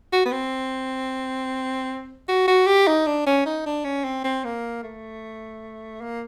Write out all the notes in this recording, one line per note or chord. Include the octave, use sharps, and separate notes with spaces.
F#4
B3
C4
F#4
F#4
G4
D#4
D4
C#4
D#4
D4
C#4
C4
C4
A#3
A3
A#3